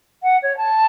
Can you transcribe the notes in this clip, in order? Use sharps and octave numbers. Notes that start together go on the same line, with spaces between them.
F#5
C#5
A5